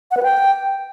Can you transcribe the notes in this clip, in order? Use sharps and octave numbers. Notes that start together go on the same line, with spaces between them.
F#5
B4
G5